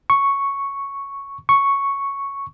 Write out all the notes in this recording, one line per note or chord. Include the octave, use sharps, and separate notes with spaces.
C#6
C#6